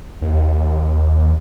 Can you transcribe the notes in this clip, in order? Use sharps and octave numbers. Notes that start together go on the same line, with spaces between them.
D#2